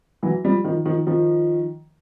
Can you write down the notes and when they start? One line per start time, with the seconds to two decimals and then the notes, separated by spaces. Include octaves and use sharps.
0.23 E3 F#3
0.45 F3 G3
0.64 D#3 F3
0.85 D#3 F3
1.07 D#3 F3